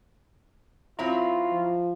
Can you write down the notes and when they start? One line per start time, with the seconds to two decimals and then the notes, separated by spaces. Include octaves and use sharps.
0.99 F#3 C4 E4 F4 A#5
1.52 F3